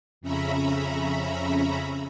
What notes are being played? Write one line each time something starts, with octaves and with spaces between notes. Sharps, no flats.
F2 C#3 C#4 E5 A#5 B5